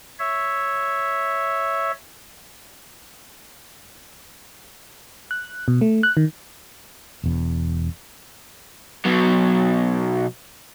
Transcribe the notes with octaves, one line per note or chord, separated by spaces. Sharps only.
C#5 E5
F#6
B2
A3
F#6
D#3
E1 E2
B2 F#3